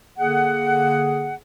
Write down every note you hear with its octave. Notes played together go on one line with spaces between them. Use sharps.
D3 A#3 G#4 F#5